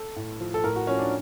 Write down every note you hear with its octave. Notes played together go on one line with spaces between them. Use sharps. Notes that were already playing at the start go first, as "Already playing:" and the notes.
Already playing: A4
A2
F3
A4
A2 A#4
F#4
F3 C#4
D4